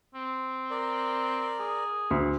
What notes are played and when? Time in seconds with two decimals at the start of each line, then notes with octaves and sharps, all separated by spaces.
0.15 C4
0.70 A#4 D5
1.59 G#4
2.11 D2